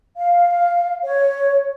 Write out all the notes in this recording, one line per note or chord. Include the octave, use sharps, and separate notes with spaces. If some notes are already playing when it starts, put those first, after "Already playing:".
F5
C#5